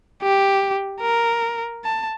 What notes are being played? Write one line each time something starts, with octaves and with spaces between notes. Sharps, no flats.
G4
A#4
A5